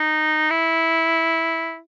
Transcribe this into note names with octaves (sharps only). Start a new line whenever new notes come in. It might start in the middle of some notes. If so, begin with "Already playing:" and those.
Already playing: D#4
E4